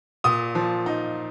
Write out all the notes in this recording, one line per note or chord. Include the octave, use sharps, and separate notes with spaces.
A#2 D#6
F3
D#4